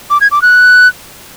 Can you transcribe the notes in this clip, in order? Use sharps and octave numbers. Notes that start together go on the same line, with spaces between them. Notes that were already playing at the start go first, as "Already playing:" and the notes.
D6
G#6
D6
F#6